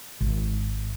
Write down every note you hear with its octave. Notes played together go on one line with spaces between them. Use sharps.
G#1